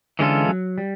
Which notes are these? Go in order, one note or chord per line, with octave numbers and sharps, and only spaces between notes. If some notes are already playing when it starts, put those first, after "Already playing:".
D3 E3 G#3 C#4 F4 A4
F#3
G3